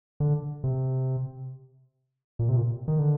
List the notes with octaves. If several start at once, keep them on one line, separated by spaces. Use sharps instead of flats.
D3
C3
A#2
C3
A#2
D#3
D3